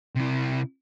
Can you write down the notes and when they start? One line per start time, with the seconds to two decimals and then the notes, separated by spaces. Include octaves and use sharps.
0.16 C3 E4